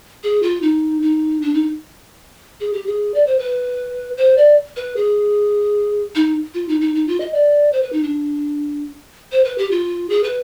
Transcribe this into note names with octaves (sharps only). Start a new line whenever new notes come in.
G#4
F4
D#4
D#4
D4
D#4
G#4
G4
G#4
D5
C5
B4
C5
D5
B4
G#4
D#4
F4
D#4
D#4
D#4
F4
D#5
D5
C5
B4
D#4
D4
C5
B4
G4
F4
G#4
B4